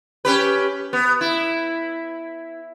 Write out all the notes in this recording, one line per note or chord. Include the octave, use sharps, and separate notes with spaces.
C#4 G4 B4
B3
E4